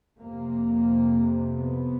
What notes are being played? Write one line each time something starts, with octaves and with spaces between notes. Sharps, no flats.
F2 C3 A#3
B3